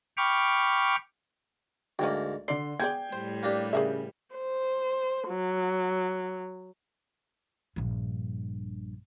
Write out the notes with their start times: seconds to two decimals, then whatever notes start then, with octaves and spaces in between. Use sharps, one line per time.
0.17 G5 B5 C#6 D6 F6
1.99 D2 G#2 A3 A#3 D4 G5
2.48 D3 D5 C6 C7
2.80 B3 G#4 D5 G5 G6 G#6
3.13 A2 G3 C5
3.43 A#3 D4 G4
3.73 C#3 G#4 A#4 E5
4.35 C5
5.28 F#3
7.76 A#1 G2